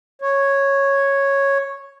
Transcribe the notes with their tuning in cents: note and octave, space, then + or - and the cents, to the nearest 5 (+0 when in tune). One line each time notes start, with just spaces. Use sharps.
C#5 -5